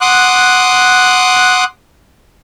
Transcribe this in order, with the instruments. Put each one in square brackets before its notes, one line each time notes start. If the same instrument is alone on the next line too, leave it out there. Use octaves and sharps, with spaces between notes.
[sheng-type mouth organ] F#5 C6 D6 D#6 F#6